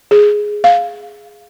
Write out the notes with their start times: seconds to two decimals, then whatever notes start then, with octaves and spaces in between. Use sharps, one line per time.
0.11 G#4
0.64 F5